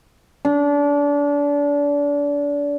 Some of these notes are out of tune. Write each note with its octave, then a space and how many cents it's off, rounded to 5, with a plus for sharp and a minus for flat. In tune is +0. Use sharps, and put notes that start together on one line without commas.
D4 -30